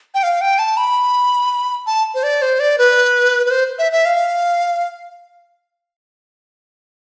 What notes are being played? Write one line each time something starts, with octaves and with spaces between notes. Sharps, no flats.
G5
F5
G5
A5
B5
A5
C5
D5
C5
D5
B4
B4
C5
E5
E5
F5